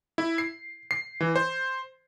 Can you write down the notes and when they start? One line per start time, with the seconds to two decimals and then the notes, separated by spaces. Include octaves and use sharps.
0.18 E4
0.38 C7
0.91 C7
1.20 E3
1.36 C5